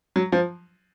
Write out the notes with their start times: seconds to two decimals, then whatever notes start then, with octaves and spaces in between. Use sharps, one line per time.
0.16 F#3
0.32 F3